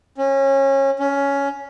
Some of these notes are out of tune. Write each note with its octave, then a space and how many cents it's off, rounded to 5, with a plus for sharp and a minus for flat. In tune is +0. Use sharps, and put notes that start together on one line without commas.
C#4 -25
C#4 +10